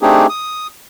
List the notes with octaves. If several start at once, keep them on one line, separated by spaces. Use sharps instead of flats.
A3 C4 D4 D#4 G4 G#4
D#6